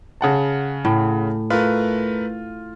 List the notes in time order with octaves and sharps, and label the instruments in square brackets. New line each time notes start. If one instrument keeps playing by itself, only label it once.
[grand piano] C#3 F#5 A5
[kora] A2
[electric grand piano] A3 A#4 B4 [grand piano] F4